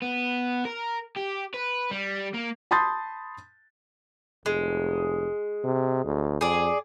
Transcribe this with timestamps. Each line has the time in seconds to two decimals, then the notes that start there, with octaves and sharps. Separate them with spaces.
0.02 B3
0.65 A#4
1.16 G4
1.54 B4
1.91 G3
2.34 A#3
2.71 A5 B5 C6 D#6 G6 A6
4.46 F1 G#3
5.64 C3
6.04 D2
6.41 F2 G#4 D5